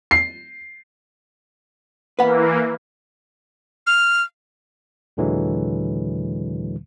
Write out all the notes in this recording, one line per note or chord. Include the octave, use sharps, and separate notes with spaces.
C7
E3 A#3 B4 F#5
F6
D#2 A#2 D3 E3 F#3 G#3